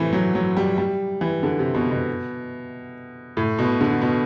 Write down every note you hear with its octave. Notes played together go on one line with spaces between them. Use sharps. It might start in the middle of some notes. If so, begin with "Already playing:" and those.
Already playing: A2 C3 E3
F#3
F#3
G3
G3
E3
D3
C3
B2
B2
A2
B2
D3
B2